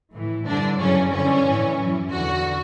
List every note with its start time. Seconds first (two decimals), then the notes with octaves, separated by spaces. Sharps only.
0.14 A2 E3
0.46 G2 D3 D4
0.79 F#2 C#3 E3 C#4
1.12 G2 D3 C#4
1.45 A2 E3
1.78 F#2 E3
2.11 E2 D3 F#4